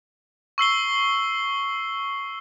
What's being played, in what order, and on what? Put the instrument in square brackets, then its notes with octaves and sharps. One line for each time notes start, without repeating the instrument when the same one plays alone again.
[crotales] C#6 E6 C7 G7